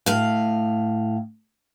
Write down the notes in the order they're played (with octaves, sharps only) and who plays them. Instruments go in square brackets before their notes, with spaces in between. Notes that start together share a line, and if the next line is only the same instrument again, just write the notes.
[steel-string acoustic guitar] A2 F5